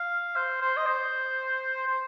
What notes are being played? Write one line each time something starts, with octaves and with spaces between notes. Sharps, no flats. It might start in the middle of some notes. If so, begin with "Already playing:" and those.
Already playing: F5
C5
C5
D#5
C5
C5